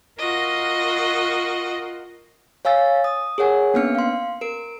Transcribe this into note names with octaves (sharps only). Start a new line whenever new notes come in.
F4 F#4 A#4 D#5
C#5 F5 G#5 E6 A6
D#6
G#4 A#4 C#5 F#5 G#5
A#3 B3 C#4 D4 F6 C#7
F5 C6
A#4 D7